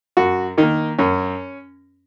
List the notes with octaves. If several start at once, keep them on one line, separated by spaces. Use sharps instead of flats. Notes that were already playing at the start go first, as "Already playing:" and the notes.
F#2 F#4
D#3 A#3 D#4
F#2 C#4